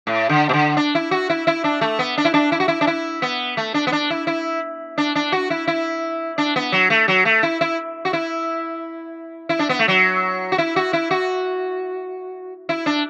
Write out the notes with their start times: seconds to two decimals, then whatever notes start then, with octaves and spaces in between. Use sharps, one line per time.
0.07 A2
0.29 D3
0.49 B2
0.53 D3
0.77 D4
0.95 E4
1.11 F#4
1.30 E4
1.47 E4
1.64 D4
1.81 A3
1.99 B3
2.17 D4
2.25 E4
2.34 D4
2.52 E4
2.60 F#4
2.68 E4
2.81 D4
2.87 E4
3.22 B3
3.57 A3
3.74 D4
3.87 B3
3.92 D4
4.10 E4
4.27 E4
4.98 D4
5.15 D4
5.32 F#4
5.50 E4
5.67 E4
6.38 D4
6.56 B3
6.72 F#3
6.90 A3
7.08 F#3
7.25 A3
7.43 E4
7.61 E4
8.05 F#4
8.13 E4
9.49 E4
9.59 D4
9.69 B3
9.79 A3
9.88 F#3
10.52 F#4
10.58 E4
10.76 F#4
10.93 E4
11.11 F#4
12.69 E4
12.86 D4